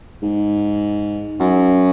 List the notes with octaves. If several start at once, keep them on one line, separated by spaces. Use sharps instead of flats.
G#2
F#2